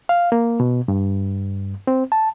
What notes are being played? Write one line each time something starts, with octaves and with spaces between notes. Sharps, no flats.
F5
A#3
B2
G2
C4
A5